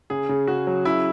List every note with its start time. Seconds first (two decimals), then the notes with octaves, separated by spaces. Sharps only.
0.10 C#3 G#4
0.29 C#3
0.47 C#3 F#4
0.67 F#3
0.85 C#3 E4